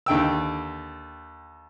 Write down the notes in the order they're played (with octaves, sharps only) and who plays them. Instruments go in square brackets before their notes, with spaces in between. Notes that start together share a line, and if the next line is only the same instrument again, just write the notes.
[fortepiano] D#2 D3 G5 E6